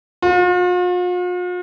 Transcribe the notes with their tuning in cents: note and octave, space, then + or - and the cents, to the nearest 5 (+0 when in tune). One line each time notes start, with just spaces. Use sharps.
F4 +45